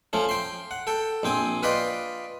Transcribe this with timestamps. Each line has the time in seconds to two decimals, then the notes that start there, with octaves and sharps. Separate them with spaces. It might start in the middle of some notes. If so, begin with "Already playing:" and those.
0.13 F3 A3 C#4
0.29 G5 C6
0.71 F#5
0.87 A4 G5
1.23 A#1 C4 G5 G#5
1.63 F4 B4 D5 D#5 G5